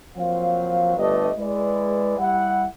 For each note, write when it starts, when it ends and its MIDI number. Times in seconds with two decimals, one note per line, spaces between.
0.17 0.96 53
0.17 0.96 54
0.17 0.96 58
0.17 0.96 60
0.17 0.96 72
0.17 0.96 77
0.98 1.30 31
0.98 1.30 57
0.98 1.30 62
0.98 1.30 67
0.98 1.30 71
0.98 1.30 75
1.38 2.15 56
1.38 2.15 64
1.38 2.15 71
1.38 2.15 74
2.19 2.66 55
2.19 2.66 64
2.19 2.66 78